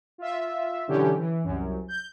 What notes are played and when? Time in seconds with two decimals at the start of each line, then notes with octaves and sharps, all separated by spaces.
0.18 F4 E5
0.88 B2 D3 E3 F#3 C#4 G4
1.18 E3
1.44 C2 F#2
1.88 G6